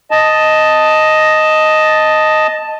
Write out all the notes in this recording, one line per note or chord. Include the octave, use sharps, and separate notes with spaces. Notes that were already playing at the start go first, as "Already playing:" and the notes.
D#5 A5